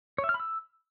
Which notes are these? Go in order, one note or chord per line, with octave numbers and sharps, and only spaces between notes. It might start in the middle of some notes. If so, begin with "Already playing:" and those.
C#5
E5
F6
B5
E6